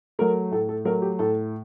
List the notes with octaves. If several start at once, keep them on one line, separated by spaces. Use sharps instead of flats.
F#3 A3 A#4
A2 A4
A4
F#3 A3 A#4
G4
A2 A4